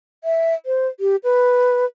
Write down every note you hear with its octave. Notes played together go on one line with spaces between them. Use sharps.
E5
C5
G4
B4